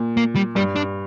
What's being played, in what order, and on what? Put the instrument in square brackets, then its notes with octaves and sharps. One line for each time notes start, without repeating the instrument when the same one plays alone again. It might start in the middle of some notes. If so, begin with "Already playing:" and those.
Already playing: [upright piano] A#2
[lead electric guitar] A#3
G3
[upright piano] G2 [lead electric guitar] G3
[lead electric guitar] D4